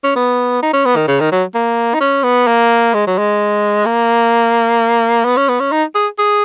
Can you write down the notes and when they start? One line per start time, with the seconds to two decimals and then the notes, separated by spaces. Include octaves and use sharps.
0.04 C#4
0.16 B3
0.63 D#4
0.74 C#4
0.85 B3
0.96 D#3
1.08 C#3
1.20 D#3
1.32 F#3
1.55 A#3
1.94 D#4
2.01 C#4
2.24 B3
2.47 A#3
2.94 G#3
3.07 F#3
3.18 G#3
3.86 A#3
5.25 B3
5.37 C#4
5.49 B3
5.60 C#4
5.72 D#4
5.95 G#4
6.19 G#4